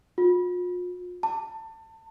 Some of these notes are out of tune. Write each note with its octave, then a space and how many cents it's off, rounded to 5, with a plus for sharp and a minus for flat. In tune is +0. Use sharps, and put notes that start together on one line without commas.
F4 +40
A5 +25